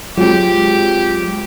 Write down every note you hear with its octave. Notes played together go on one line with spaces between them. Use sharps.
F#3 G#3 C4 F4 G4